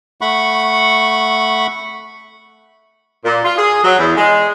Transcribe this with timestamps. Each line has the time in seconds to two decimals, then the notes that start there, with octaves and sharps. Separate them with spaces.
0.21 A3 F#5 B5 C#6
3.25 A#2
3.44 F4
3.58 G#4
3.84 F#3
3.99 E2
4.17 G#3